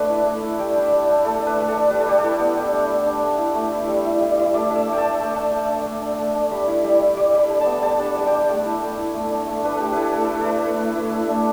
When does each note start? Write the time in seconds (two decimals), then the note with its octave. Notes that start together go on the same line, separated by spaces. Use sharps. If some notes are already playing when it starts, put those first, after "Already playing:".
Already playing: A3 D4 A4 B4
0.10 E4
0.16 D5
0.26 A3
0.37 E5
0.42 E4
0.59 G3 G5
0.75 D4
0.81 E5
0.92 G3
1.03 D5
1.08 D4
1.25 A3 A4
1.42 D4 B4
1.58 A3
1.68 A4
1.74 D4
1.91 G3 B4
2.00 A4
2.07 G3 G4
2.18 A4
2.24 E4
2.40 B3
2.56 G3
2.72 D4
2.90 G3
3.06 D4
3.23 A3
3.39 E4
3.55 A3
3.72 E4
3.88 G3
4.05 E4
4.21 G3
4.38 E4
4.54 A3 D5
4.70 D4
4.76 E5
4.87 A3
4.93 G5
4.98 A5
5.03 D4
5.20 A3
5.36 D4
5.52 A3
5.69 D4
5.85 A3
6.02 D4
6.19 A3
6.35 D4
6.51 G3 B5
6.67 E4
6.84 G3 B5
7.01 E4
7.17 G3 D6
7.34 G3
7.39 B5
7.50 D4
7.61 A5
7.66 B3
7.83 G3 A5
7.99 D4
8.05 B5
8.16 G3
8.27 G5
8.32 D4
8.49 A3 G5
8.65 E4
8.82 A3
8.98 E4
9.14 A3
9.31 D4
9.47 A3
9.64 D4 B4
9.73 A4
9.80 A3 G4
9.92 E4 B4
10.02 A4
10.12 A3
10.24 A4
10.30 E4
10.41 A4
10.46 A3 B4
10.62 E4
10.79 A3
10.96 E4
11.11 A3
11.28 D4